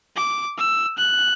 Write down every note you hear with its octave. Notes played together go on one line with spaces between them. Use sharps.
D6
E6
F#6